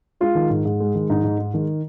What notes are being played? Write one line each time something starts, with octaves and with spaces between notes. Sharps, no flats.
G#3 F4
D#3
G#2
G#2
G#3
D#3
G#2 D#4
G#2
G#3
D#3